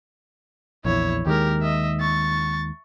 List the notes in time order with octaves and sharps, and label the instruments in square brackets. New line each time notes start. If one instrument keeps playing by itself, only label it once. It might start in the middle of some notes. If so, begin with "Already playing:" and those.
[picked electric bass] A#1 E2 [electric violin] E4 C#5
[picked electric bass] D#2 D#3 G#3 [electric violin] G4 A#4
[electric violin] D#5 E5
C#6 A6